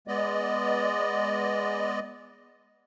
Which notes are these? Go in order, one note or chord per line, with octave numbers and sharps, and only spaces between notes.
G#3 B3 D5 D#5